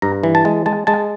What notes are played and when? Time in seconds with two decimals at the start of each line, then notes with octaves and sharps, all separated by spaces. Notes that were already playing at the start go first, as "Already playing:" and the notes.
0.02 G2 A#5
0.23 E3
0.35 A5
0.45 G#3
0.66 G#3 A5
0.87 G#3 A5